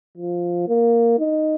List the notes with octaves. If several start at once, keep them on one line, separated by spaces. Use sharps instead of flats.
F3
A#3
D#4